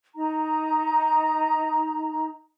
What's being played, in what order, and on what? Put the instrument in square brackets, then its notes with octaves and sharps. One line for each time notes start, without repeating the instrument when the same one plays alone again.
[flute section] D#4 A#5